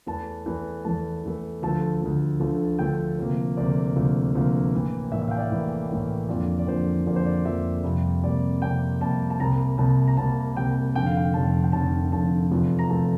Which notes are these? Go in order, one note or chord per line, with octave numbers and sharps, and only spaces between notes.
E2 E3 A3 A5
E2 E3 A3
E2 E3 A3 A5
E2 E3 A3
D2 D3 F3 A3 A5
D2 D3 F3 A3
D2 D3 F3 A3
D2 D3 F3 A3 G5
D2 C3 F3 A#3
D2 C3 F3 A#3 D5
D2 C3 F3 A#3
D2 C3 F3 A#3
A1 A2 E3 A#3
A1 A2 E3 A#3 E5
E5
F5
G5
D5
E5
A1 A2 E3 A#3
A1 A2 E3 A#3
F2 D3 F3 A#3 D5
D5
F2 D3 F3 A#3 C5
F2 D3 F3 A#3 D5
C5
D5
F2 D3 F3 A#3 E5
F2 C3 G3 A#3
F2 C3 G3 A#3 D5
F2 C3 G3 A#3 G5
F2 C3 G3 A#3 A5
A5
C2 C3 G3 A#3 A#5
C2 C3 G3 A#3 A5
A#5
C2 C3 G3 A#3 A5
C2 C3 G3 A#3 G5
F1 F2 D3 G5
F5
G5
F1 F2 D3 A5
G5
F1 F2 D3 A5
F1 F2 D3 A5
E2 C3 F3 A3
A#5
E2 C3 F3 A3 A5